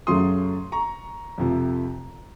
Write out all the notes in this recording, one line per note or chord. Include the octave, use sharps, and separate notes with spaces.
F#2 C#3 F#3 A3 C6 D#6
A#5 C#6
F2 C3 F3 A3